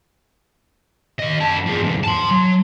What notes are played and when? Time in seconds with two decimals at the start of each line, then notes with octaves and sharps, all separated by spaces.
1.20 D#2 D#5
1.40 F#2 A5
1.66 F3 G#4
1.83 E2 G#2
2.04 A5 C6
2.31 F#3